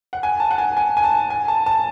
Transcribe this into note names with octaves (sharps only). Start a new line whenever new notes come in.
F#5
G#5
A5
F#5
G#5
G#5
G#5
A5
G#5
A5
A5